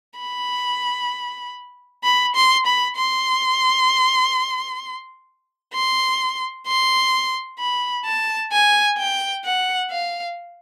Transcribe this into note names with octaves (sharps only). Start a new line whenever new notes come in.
B5
B5
C6
B5
C6
C6
C6
B5
A5
G#5
G5
F#5
F5